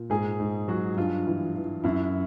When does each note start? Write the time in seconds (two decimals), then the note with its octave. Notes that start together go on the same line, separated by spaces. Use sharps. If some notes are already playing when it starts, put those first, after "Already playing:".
Already playing: A#2
0.10 G#2 G#4
0.40 G#2
0.68 F#3 F#4
0.96 G2 F4
1.27 E3
1.55 E3
1.84 F#2 E4